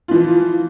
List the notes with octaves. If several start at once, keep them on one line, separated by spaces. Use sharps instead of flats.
E3 F3 F4